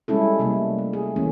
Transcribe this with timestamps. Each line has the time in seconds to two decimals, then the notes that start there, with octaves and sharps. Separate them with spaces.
0.08 G3 G#3 C#4 E4 A4
0.39 C3 G3 A3 A#3
0.79 A3
0.93 G#4
1.16 E3 A3 A#3 C#4